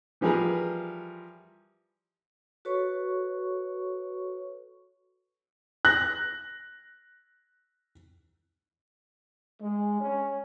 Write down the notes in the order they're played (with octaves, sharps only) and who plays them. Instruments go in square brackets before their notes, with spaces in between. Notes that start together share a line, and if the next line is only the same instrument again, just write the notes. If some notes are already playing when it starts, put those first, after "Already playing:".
[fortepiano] E3 F3 G3 G#4 A#4 B4
[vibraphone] F#4 A4 B4 C#5 C#6
[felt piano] F#6 A#6
[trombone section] G#3
C#4